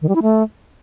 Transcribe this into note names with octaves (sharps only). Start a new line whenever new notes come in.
D#3
G3
E4
A3